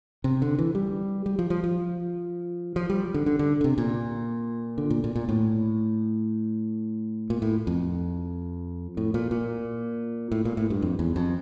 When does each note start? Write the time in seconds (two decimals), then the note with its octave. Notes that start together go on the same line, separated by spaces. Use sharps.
0.24 C3
0.42 D3
0.58 E3
0.75 G3
1.26 G3
1.39 F3
1.50 F3
1.64 F3
2.76 F3
2.90 G3
3.14 D3
3.26 D3
3.39 D3
3.61 D3
3.64 C3
3.78 A#2
4.78 D3
4.90 A#2
5.04 A#2
5.15 A#2
5.29 A2
7.30 A#2
7.42 A2
7.67 F2
8.97 A2
9.14 A#2
9.31 A#2
10.32 A2
10.45 A#2
10.57 A2
10.70 G2
10.82 F2
10.99 E2
11.16 F2